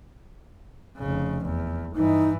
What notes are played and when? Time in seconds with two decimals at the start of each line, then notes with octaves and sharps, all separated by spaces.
0.97 F1 C#3
1.45 E2
1.95 G2 E3 D#4